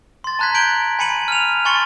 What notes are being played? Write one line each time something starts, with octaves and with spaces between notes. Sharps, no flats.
C6 A6
A5 A#5 F#6 G#6 B6
G6 D7 F#7 G7
G#5 B5 C#7 D#7 F#7
F6 F7
G#5 C6 C#6 A6 C#7 F#7